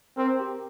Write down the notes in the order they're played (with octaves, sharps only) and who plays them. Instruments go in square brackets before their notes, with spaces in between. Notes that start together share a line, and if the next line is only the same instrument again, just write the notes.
[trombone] C4 [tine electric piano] A#4
[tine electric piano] G4